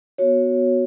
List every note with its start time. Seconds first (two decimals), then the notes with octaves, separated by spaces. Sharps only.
0.18 B3 F#4 C#5